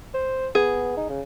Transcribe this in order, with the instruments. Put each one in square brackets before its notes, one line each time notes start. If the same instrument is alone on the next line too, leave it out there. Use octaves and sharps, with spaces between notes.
[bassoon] C5
[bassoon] B3 [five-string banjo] G#4
[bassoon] D#4
C#3